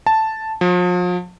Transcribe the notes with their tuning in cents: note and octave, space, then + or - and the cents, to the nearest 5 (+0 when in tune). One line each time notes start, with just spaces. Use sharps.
A5 +0
F3 +40